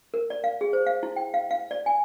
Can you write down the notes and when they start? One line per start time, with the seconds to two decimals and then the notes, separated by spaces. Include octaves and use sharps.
0.14 A#4
0.30 D5
0.44 F5
0.61 G#4
0.73 C5
0.86 F5
1.03 E4
1.16 G5
1.34 F5
1.51 F5
1.71 D5
1.86 G#5